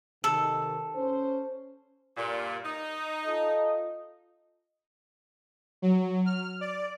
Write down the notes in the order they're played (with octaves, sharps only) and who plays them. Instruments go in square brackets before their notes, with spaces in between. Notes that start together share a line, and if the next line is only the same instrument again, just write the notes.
[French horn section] C3 D#3 [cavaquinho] A4
[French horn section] C#4 C5
[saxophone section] G2 A#2
D#4
[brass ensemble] F4 A4 D#5
[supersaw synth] F#3
F6
D5